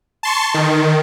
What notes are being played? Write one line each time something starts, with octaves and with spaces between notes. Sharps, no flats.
A5 C6 C#6
D#3